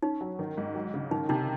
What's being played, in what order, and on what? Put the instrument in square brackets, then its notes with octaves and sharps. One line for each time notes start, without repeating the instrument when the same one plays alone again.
[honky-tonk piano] C#4 [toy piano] D#4
[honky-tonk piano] F#3
D#3
G#2
F#3
C#3
[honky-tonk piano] D#3 [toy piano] D#4
[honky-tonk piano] C3 [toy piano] D#4